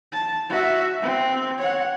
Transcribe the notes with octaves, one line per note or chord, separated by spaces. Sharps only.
A5
F#4 E5
C4
C#5 F#5